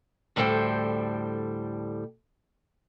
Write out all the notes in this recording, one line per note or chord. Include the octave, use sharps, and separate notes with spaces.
D2 A2 G3 A4 C5 G5